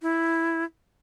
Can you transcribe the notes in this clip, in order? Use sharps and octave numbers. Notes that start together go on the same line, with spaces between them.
E4